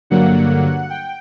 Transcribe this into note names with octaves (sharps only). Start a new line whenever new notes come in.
G2 D3 F#3 A#3 F#5
G5